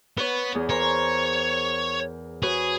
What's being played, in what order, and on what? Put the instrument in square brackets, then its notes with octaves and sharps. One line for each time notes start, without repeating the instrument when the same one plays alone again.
[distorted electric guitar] B3 [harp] B4 C#5
[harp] E2 G#4
[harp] A#4 C5 C6 [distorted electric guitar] C#5
[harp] F#4 B4 C#5 [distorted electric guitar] G#4